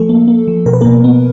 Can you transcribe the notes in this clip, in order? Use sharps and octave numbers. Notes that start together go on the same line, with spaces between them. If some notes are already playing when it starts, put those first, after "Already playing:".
Already playing: F3 A3 A4
A#3
A#3
F3
B2 A#4
B4
B2 A#3 A#4
B3